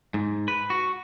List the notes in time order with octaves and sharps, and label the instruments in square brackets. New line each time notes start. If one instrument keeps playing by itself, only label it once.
[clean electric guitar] G#2
B4
F#4